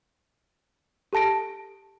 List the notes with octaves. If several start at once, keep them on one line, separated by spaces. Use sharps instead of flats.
G4 A4 A5 A#6 D7